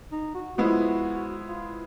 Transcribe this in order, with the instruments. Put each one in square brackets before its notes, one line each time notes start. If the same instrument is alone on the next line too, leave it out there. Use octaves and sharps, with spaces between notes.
[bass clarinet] D#4
F#4
[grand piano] F3 G#3 B3 E4 [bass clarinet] F#4
[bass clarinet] F4